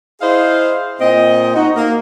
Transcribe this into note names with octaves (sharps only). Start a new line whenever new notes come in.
E4 G#4 C5 D#5 F5
A#2 C4 D#5
D#4 F#4
A#3